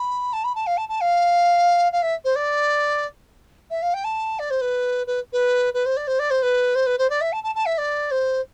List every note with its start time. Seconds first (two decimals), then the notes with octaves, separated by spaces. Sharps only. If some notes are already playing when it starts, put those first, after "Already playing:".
Already playing: B5
0.33 A5
0.44 B5
0.55 A5
0.66 F5
0.77 A5
0.89 A5
1.01 F5
1.92 F5
2.02 E5
2.24 C5
2.35 D5
3.70 E5
3.82 F5
3.94 G5
4.04 A5
4.39 D5
4.50 C5
4.61 B4
5.07 B4
5.32 B4
5.74 B4
5.85 C5
5.96 D5
6.07 C5
6.19 D5
6.30 C5
6.42 B4
6.75 C5
6.86 B4
6.98 C5
7.10 D5
7.21 E5
7.32 A5
7.43 A5
7.55 A5
7.66 E5
7.78 D5
8.11 C5